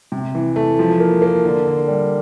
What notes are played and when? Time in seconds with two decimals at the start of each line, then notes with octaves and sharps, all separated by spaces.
0.12 C3
0.35 E3
0.56 A3
0.79 F3
1.00 A#3
1.22 A#3
1.45 D3
1.67 D3
1.88 G3